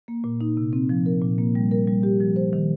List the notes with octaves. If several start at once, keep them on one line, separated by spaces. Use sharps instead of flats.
A#3
A#2
D#4
C3
C4
F3
A#4
A#2
A#3
G3
A#4
G3
G4
F3
C5
D#3